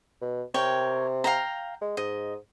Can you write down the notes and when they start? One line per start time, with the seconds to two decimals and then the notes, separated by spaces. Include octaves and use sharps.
0.22 B2
0.54 C3 A#4 C#5 G5
1.24 F5 G5 A#5
1.81 G#3
1.97 G#2 D#5